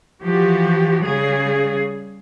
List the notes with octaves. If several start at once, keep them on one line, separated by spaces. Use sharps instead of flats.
E3 F3 F#4 G4
C#3 G3 G#4